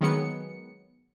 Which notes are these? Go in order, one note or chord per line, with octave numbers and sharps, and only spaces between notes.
D#3 F#3 G#3 B3 C#7